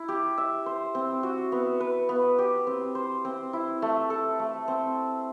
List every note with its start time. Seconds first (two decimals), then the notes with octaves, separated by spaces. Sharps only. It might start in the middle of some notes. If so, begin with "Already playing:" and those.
Already playing: E4
0.08 G4
0.38 E5
0.66 C5
0.95 C4
1.23 F#4
1.52 B3
1.80 B4
2.09 B3
2.38 G4
2.67 C4
2.95 C5
3.25 C4
3.53 E4
3.82 A3
4.10 A4
4.40 A3
4.68 C4